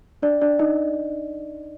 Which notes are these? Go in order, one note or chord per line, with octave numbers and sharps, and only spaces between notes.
D4 D5
D4 D5
D#4 D#5